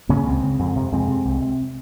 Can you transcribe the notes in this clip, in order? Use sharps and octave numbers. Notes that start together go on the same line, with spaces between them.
C#3 A#3 C#4
C#2 G#3 C4
C#3
F2
C3
F2 G#3 C4
C3
C2
C3